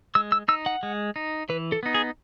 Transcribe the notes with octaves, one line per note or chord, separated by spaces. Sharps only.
G#3 E6
E6
D#4 E6
F#5
G#3
D#4
E3 B4
A4
B3 D#4
G#4